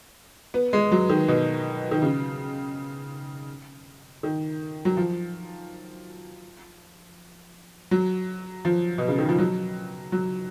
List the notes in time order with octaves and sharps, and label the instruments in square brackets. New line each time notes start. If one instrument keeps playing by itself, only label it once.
[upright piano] B3
G#3
F#3
D#3
B2
D#3
C#3
D#3
F#3
F3
F#3
F3
B2
C#3
D#3
F3
F#3
F#3